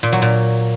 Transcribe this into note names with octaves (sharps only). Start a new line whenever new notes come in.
A#2
F#3
A#2